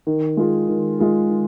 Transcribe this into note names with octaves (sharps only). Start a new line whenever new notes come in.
D#3
G#3 F4 G#4
D#3
G#3 F4 G#4
D#3